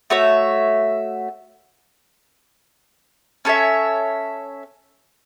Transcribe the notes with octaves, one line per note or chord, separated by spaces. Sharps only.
A3 F#4 C#5 E5
C#4 A4 C#5 E5